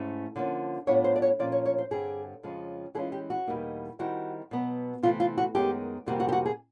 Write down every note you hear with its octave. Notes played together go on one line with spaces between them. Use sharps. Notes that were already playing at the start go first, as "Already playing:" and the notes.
Already playing: G#2 A3 C#4 E4
D3 F3 A#3 C#4
A2 F#3 B3 D4 F4 C#5
C5
D5
C#5
A#2 F3 A#3 C#4 F4 D5
C#5
C#5
C5
G2 D3 G3 C4 G#4
F2 C#3 F3 G#3 C#4
E3 G#3 C#4 F4 G#4
G4
F#4
E2 B2 G3 A#3 D#4
D#3 G3 C4 E4 F#4
B2 F#3 B3
C3 E3 A3 F4
F4
F#4
F#2 D#3 G#3 B3 G4
F2 C3 D#3 G3 A#3 F#4
F#4
G4
F#4
G#4